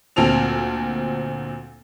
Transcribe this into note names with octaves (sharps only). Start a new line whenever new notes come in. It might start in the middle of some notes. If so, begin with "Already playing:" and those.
D2 A#2 C4 A5 F7